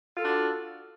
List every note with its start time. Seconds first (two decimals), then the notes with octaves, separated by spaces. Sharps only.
0.16 F4
0.19 A4
0.22 D4
0.25 F#4